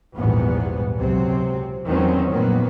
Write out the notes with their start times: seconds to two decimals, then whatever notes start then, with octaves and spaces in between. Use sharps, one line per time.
0.15 A#1 E2 G#2 G3 B3
0.96 C#2 C3 F#3 C4
1.85 E2 G2 D#3 F#3 C4 C#4
2.30 F2 A#2 D#3 F#3 A#3 B3